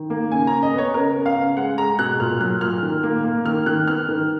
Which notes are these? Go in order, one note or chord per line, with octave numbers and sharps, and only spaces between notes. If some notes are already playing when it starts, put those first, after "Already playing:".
Already playing: D#3
A#3
C#3 G#5
A#5
C#3
D#5
B3 C#5
C#3 A#4
B3
F5
C#3
G#3 F#5
G#3 A#5
B2 F#6
A#2 F6
F#3 F#6
A#2 F6
D#3
A#3
A#3
D#3 F6
D#3 F#6
B3 F6
D#3